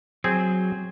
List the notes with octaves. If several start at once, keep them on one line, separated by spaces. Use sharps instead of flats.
F#3 C4 G#4 G#5